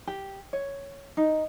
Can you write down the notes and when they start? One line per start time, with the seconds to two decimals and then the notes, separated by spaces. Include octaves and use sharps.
0.07 G4
0.53 C#5
1.17 D#4